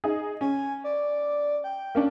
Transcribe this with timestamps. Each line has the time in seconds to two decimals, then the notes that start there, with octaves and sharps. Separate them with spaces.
0.04 D#4 G#4
0.41 C#4 G#5
0.84 D5
1.64 G5
1.95 A#3 C#4 D4